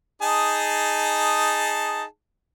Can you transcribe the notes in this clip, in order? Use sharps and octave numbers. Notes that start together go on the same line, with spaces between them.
D#4 G#4 A5